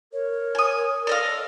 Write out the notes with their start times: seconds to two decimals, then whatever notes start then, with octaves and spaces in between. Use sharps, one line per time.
0.13 A#4 C#5
0.55 G#5 D#6
1.07 A4 D5 D#5 F5